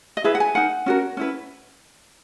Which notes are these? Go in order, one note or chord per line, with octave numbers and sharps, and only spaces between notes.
D#5
E4 G#4 B4 E5
F#5
G#5
D#4 A#4 F#5
C#4 F#4 A#4
C#4 E4 B4